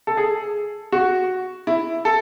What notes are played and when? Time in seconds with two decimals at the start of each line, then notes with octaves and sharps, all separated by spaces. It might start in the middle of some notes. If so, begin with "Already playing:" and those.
0.07 A4
0.17 G#4
0.92 F#4
1.67 E4
2.05 A4